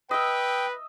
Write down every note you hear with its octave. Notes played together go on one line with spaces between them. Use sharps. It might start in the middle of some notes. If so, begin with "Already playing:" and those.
B4 D#5 E5 G5